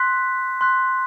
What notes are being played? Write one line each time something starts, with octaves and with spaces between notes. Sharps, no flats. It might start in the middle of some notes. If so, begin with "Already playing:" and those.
Already playing: C6 F#6 B6
C6 F#6 B6